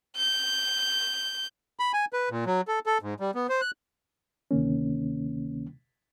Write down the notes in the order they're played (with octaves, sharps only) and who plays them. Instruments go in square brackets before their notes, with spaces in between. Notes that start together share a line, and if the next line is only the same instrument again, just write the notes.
[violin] G6
[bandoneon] B5
G#5
B4
A#2
F#3
A4
A4
G#2
G3
B3
C5
F#6
[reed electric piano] D2 C3 D#3 A#3 C#4